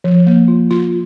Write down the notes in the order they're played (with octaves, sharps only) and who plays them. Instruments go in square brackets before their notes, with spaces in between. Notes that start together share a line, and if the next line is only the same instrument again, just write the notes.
[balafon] F3
A#3
F4
F4